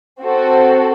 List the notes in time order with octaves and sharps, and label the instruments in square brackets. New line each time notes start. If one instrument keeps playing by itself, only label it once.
[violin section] C4 F#4 A4